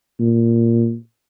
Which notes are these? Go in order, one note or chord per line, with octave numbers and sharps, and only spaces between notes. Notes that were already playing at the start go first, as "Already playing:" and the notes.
A#2